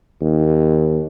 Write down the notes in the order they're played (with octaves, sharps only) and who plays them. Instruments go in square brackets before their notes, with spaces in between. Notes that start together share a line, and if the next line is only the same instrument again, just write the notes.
[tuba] D#2